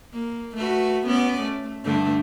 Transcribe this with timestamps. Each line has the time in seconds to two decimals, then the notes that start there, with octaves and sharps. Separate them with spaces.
0.13 A#3
0.57 A3 F#4 B4
1.06 B3 C#4 D5
1.42 A3
1.84 G2 D3 A3